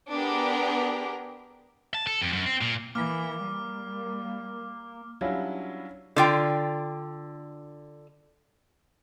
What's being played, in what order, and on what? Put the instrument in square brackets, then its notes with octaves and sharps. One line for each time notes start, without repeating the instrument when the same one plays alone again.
[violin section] B3 D4 G4 G#4 A#4
[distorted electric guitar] A5
A4
F2
F#2
C4
A#2
[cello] E3 [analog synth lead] A#3 [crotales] D6 F6
[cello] G3
[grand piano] F#3 G3 C#4 D4 E4 F4
[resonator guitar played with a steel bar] D3 F4 G5